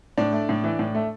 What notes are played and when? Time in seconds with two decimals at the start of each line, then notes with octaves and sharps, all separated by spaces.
0.18 A2 D4 D5
0.33 A3
0.49 A2
0.64 E3
0.79 A2
0.95 A3